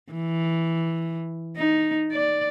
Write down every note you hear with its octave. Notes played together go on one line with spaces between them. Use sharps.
E3
D#4
D5